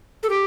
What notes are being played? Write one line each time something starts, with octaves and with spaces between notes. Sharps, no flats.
A4
G4